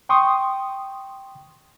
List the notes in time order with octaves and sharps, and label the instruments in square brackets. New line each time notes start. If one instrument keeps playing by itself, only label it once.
[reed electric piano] G5 C6 C#6 D#6